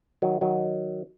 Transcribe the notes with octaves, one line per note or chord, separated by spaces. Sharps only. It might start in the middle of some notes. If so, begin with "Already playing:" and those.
D#3 F#3
D#3 F#3